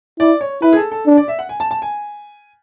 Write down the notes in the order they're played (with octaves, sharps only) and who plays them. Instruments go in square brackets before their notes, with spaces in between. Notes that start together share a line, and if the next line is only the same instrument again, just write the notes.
[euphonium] E4 [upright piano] D5
[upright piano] C#5
[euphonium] E4 [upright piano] B4
[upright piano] G#4
A4
A4
[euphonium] D4
[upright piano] D5
E5
F#5
G#5
A5
A5
G#5